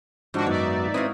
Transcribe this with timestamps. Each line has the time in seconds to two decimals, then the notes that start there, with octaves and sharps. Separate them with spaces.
0.34 G#2 D#3 F3 D4 F#4
0.46 F#2 B3 D#4 F#4 C#5 D5 E5
0.94 C4 E4 F#4 B4 F5 D#6